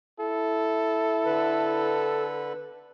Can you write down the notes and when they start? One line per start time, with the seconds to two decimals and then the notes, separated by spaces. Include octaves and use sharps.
0.20 E4 A4
1.26 D3 B4